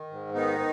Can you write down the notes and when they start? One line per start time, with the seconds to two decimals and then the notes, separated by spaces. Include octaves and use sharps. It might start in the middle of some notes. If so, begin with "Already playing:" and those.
Already playing: D#3
0.10 G#2
0.33 D#3 B3 D#4